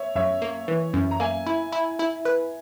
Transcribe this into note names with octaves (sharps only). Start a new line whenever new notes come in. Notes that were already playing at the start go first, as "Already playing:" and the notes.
Already playing: C#5 E5
F#2 C#5 E5
A#3
E3
F#2
A#5
A#3 E5 G#5
E4
E4
E4
B4